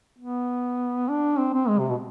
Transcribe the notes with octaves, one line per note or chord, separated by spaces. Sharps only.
B3
D4
C4
C4
G#3
C3
B2